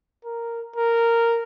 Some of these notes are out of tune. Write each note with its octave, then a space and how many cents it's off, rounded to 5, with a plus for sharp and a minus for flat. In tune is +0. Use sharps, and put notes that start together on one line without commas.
A#4 -5
A#4 -10